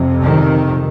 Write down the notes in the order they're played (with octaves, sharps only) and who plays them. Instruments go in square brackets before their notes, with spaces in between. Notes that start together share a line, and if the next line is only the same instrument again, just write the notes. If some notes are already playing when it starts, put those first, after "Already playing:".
Already playing: [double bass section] F2 C3
D#3